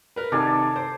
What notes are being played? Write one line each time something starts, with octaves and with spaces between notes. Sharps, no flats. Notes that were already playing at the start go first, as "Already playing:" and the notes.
A#4 B4
C3 D#3 A4 D5 G#5
C5